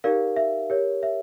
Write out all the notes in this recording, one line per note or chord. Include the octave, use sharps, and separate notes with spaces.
D#4 G4 A#4 D5 F5
E5
G4 A#4 C#5
E5